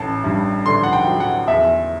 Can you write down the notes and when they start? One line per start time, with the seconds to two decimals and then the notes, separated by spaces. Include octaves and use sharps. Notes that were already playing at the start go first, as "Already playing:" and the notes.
Already playing: A1 A5
0.24 G2
0.65 D3 C6
0.83 F#5
0.93 G5
1.07 F#3
1.20 F#5
1.48 E2 E5